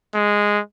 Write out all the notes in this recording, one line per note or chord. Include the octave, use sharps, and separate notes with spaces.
G#3